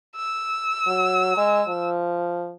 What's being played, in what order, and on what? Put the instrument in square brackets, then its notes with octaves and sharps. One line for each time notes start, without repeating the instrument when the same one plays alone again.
[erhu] E6
[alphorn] F#3
G#3
F3